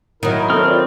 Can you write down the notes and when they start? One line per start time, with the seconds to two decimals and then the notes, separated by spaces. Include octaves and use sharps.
0.23 D#3 F#3 E4 A#4
0.37 A#5 D#6
0.50 C4 A4 C#5 D#6 F6
0.69 F4 D5